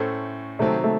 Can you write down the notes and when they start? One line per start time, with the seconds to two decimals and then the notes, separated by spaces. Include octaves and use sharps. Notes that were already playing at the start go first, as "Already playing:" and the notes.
Already playing: A2 A3 C#4 A4 C5
0.59 C3 D#3 F#3 A3 C4
0.84 A3